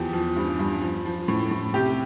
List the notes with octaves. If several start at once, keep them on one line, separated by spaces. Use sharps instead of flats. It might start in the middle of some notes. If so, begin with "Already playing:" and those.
Already playing: E2 F3 G4
F3
G2
G2
F3
F3
A2
A2
C3 G4